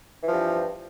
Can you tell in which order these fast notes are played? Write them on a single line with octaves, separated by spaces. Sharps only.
E3 F3 G2